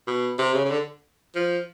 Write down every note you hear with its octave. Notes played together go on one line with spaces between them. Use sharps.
B2
C3
C#3
C#3
D3
F3